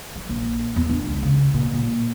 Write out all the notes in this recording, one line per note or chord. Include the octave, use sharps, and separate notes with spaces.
F#3
A#1
E2
D4
C#2
C#3
A#2
A#2